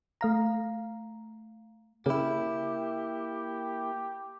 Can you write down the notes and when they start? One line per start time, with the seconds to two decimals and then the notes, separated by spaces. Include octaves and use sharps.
0.21 A3 F5 A#5
2.06 C#3 A#3 E4 G4